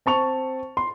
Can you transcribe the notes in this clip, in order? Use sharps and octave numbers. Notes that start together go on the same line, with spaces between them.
C4 A5 C#6 F7
C6